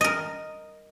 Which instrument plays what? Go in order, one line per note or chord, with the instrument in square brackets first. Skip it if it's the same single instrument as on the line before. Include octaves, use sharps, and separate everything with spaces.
[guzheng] A#4 D#5